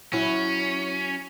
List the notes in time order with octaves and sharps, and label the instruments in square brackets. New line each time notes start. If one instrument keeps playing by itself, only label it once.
[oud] F#3 E4 [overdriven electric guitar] C#4